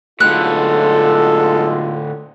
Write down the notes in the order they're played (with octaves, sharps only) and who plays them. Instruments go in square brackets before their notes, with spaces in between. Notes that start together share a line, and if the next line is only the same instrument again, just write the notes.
[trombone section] B1 G#3 F4 [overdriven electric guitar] A2 D3 [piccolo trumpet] A4 [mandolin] F#6